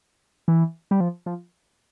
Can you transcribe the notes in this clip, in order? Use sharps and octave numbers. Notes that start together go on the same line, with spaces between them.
E3
G3
F3
F3